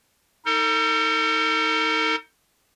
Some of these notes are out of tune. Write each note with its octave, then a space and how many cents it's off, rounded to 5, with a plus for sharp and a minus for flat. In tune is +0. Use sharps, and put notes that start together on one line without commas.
D#4 +20 A4 +45